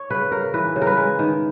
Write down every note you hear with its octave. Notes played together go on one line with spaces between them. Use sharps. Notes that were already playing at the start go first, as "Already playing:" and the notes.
Already playing: C#5
C#3 B4
C#3 A#4
E3 B4
C#3
A#4
B4
G#3
D#3